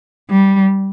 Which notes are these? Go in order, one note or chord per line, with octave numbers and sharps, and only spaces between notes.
G3